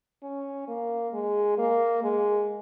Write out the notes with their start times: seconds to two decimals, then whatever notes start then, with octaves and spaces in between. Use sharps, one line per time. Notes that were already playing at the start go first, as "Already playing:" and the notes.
0.23 C#4
0.68 A#3
1.13 G#3
1.58 A#3
2.03 G#3